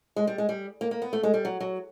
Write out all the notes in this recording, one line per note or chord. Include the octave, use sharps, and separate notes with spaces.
G#3
G3
G#3
G3
A#3
A#3
B3
A3
G#3
G3
F#3
F#3